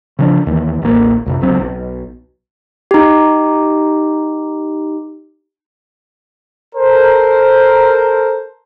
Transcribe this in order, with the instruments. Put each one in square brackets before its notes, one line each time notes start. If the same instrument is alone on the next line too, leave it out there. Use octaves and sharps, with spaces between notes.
[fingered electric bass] C#3 F3 D4
D#2 E3
D1 A1 A#3
C2 F2 C3
G1 C#2 F#3 C4
B1
[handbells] D#4 G4
[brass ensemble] A4 A#4 C5